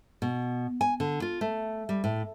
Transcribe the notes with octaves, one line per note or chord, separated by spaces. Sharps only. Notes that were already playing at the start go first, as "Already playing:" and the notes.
B2
G#5
D3
F4
A3
G3
A2